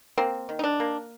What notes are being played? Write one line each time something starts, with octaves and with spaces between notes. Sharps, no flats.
A#3 C4
D#3
D#4
D4
A#3